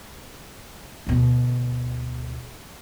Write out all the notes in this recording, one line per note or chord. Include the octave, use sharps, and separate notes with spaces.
D2 B2